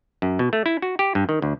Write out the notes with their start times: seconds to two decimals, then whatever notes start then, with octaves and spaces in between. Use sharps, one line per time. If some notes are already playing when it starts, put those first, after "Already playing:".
0.22 F#2
0.39 B2
0.53 A3
0.66 E4
0.82 F#4
0.99 G4
1.15 G2
1.29 D#3
1.42 D2